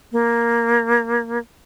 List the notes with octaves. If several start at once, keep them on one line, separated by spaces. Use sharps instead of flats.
A#3